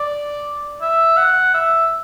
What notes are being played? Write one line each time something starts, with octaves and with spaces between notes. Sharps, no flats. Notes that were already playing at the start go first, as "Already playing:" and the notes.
Already playing: D5
E5
F#5
E5